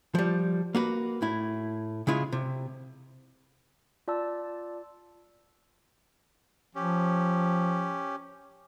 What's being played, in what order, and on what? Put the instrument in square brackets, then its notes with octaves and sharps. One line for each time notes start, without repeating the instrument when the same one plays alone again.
[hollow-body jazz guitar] F3 G3
A#3 F#4 B4
A2 E4
C#3 G#3 E4 F4
C3
[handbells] F4 D5 A5 E6
[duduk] F3 [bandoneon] C#4 G4